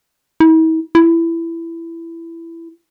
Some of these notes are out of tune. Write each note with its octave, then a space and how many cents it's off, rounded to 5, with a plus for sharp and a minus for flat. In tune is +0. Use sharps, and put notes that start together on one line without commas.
E4 -45
E4 +15